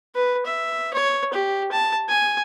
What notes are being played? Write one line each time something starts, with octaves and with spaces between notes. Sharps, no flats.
B4
E5
C#5
G4
A5
G#5